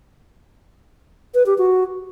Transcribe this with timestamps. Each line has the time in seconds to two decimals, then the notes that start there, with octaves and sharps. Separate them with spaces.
1.34 B4
1.46 G4
1.58 F#4